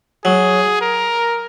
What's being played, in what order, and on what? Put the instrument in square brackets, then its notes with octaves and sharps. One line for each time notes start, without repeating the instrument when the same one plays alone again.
[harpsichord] F#3 [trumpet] G#4
[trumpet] A#4